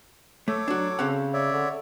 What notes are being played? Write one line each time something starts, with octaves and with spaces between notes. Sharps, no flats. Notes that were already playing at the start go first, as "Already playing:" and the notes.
A3 A4 C#5 D6
F#3 D4 F#4
C#3 C4 C#4 F#5
C#5 D5 E5
D3